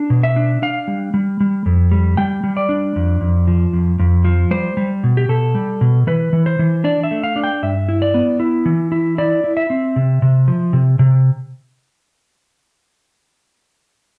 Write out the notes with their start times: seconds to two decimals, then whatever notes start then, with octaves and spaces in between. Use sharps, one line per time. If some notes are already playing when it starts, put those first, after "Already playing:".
Already playing: D4
0.10 B2
0.23 E5
0.36 D4
0.62 D4 F5
0.88 G3
1.14 G3
1.40 G3
1.66 F2
1.92 G3
2.17 G3 G5
2.44 G3
2.57 D5
2.69 D4
2.96 F2
3.21 F2
3.48 F3
3.73 F2
4.00 F2
4.25 F3
4.51 G3 C5
4.77 G3
5.04 B2
5.17 G4
5.29 B2 A4
5.55 G3
5.81 B2
6.07 E3 B4
6.33 E3
6.46 C5
6.59 E3
6.84 D4 D5
7.04 E5
7.11 A3
7.24 F5
7.36 D4
7.44 G5
7.63 G2 E5
7.89 E4
8.02 D5
8.14 B3
8.40 E4
8.66 E3
8.92 E4
9.18 E4 D5
9.44 E4
9.57 E5
9.70 C4
9.96 C3
10.22 C3
10.48 F3
10.73 C3
10.99 C3